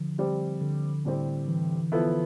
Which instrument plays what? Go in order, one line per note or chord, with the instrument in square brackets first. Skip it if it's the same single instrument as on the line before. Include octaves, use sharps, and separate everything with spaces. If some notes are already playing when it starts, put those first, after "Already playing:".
Already playing: [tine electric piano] D3 F3
[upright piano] G3 C4 G4
[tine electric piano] D3
[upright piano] A2 G3 C4 G4
[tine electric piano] E3
[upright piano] F3 B3 E4 A4